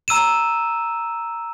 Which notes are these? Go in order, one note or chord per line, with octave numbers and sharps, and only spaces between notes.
A#5 E6 D#7 E7